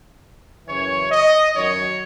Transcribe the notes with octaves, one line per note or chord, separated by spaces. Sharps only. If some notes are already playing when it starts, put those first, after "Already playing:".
F#2 C#3 E3 C#5
D#5
F#2 D#3 F#3 C#5